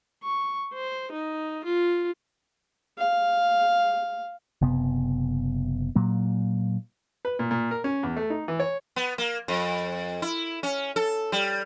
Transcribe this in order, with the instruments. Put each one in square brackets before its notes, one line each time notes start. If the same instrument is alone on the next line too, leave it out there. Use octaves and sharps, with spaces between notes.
[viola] C#6
C5
D#4
F4
[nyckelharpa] F5
[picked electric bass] F#1 C3 B3
A#2 F#3 A#3
[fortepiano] B4
A#2
A#2
A#4
C#4
E2
A3
D#4
E3
C#5
[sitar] B3
A#3
F2
E4
C#4
A4
G3